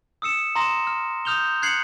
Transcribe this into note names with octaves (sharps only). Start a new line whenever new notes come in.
D#6 E6 C#7 E7
A#5 C6 D#6 A#6 E7
F6
D#6 F6 G6 F7 G7
F#6 G#6 C7 C#7 F#7